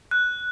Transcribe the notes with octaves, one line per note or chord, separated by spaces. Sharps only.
F#6